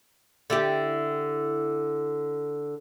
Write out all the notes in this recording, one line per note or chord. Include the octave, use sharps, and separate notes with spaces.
D3 E4 G4